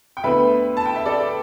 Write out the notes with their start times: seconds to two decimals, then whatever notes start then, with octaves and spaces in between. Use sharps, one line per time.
0.17 G5
0.23 D2 D3 B3 B4 E5
0.77 A5
0.85 G5
0.96 E5
1.05 A4 D5